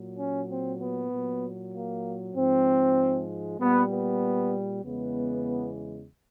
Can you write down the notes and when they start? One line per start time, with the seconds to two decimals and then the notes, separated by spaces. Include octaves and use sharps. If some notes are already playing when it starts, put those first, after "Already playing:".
Already playing: A#2 F#3
0.18 C#4
0.50 C4
0.80 B3
1.12 A#2 F#3
1.73 A#3
2.36 G#2 F3 G#3 C4
3.60 A#2 G3 B3
3.91 B3
4.84 E2 C#3 E3 G#3 B3